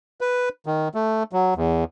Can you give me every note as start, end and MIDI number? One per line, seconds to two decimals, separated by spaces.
0.21 0.49 71
0.66 0.88 51
0.95 1.23 57
1.33 1.54 54
1.56 1.84 40